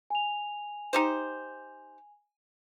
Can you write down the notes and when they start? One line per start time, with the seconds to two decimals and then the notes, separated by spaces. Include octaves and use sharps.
0.10 G#5 F7
0.93 D#4 G4 C5